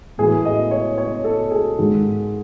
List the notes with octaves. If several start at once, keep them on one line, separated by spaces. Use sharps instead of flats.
A2 E3 A3 G#4
D#5
C#5
C#5
A4
G#4
G#2 D#3 G#3